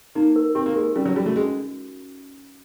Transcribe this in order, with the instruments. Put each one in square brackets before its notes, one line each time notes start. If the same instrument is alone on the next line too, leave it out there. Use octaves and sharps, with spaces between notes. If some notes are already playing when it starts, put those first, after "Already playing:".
[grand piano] A#3 [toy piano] D#4
[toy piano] A#4
[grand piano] C4 [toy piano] G4
[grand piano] A#3
[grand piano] G#3 [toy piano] A#4
[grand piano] G3 [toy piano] C#4
[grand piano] F#3
[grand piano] G3 [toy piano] F#4
[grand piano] A3
[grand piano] G#3 [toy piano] C#4